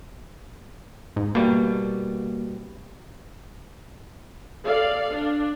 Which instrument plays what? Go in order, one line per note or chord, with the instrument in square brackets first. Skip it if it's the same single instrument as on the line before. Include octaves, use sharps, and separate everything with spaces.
[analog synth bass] G#2
[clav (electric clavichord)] B2 G3 [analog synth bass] A#3
[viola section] A4 D5 F5
D4